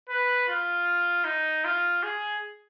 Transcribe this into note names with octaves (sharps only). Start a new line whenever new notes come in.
B4
F4
D#4
F4
G#4